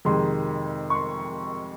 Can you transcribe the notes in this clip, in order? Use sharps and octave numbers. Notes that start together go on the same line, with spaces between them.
F2 C3 D#3 G#3 C6
C#6
C6